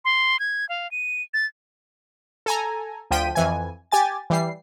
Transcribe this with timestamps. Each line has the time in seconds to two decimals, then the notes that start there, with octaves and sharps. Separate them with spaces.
0.05 C6
0.40 G#6
0.69 F5
0.91 D#7
1.34 A6
2.46 A4 G#5 A#5
3.11 D2 F3 G5 B6 D#7
3.35 F2 E3 G#5
3.91 G4 G#5 A6
4.30 E3 G3 C7